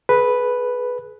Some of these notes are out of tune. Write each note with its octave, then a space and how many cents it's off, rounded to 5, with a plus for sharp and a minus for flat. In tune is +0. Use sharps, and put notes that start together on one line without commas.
G#4 +35 B4 +0